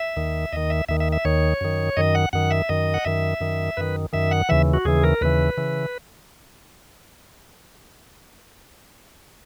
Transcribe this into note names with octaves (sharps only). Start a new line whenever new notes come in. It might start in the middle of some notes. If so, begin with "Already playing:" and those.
Already playing: E5
D#2 D#3
D#2 D#3 D#5
E5
D#2 D#3 E5
E5
E5
D#2 D#3 C#5
F#2 D#3
F#2 D#3 D#5
F#5
F#2 D#3 F#5
E5
F#2 D#3 D#5
F#5
F#2 D#3 E5
F#2 D#3
F#2 D#3 B4
F#2 D#3 E5
F#5
D#2 C#3 E3 E5
F#4
D#2 C#3 E3 G#4
A#4
D#2 C#3 E3 B4
C#3 E3